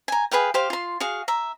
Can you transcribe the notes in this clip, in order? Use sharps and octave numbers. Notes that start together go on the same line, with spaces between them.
G#5 A#5
G#4 B4 F5 G5
G4 C5 F5
F4 C6
F#4 G#4 F5
E5 A#5